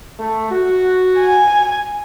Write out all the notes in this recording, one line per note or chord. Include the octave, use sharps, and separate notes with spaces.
A3
F#4
G#5